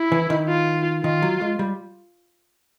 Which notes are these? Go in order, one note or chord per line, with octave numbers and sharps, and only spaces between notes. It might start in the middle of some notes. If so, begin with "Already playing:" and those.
Already playing: E4
E3
D#3
F4
D#3 F4
F#3
G#3
G3